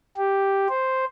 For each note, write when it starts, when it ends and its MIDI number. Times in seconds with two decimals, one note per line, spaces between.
0.17 0.67 67
0.69 1.05 72